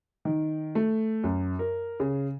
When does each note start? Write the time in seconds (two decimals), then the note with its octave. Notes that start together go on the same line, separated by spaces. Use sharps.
0.25 D#3
0.75 A3
1.24 F#2
1.59 A#4
2.00 C#3